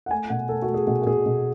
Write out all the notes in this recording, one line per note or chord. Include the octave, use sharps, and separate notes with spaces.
F#5
A3 G#5
B2 F#5
A3 A4
F#4
A3
G#4
B2 F#4
F#4
B2 G#4
B2